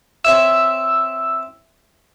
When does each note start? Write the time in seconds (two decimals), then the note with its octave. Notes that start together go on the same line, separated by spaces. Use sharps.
0.25 C4 C#5 E5 E6